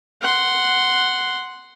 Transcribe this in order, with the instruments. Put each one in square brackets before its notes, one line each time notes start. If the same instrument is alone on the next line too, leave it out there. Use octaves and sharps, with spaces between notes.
[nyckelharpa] F#5 C6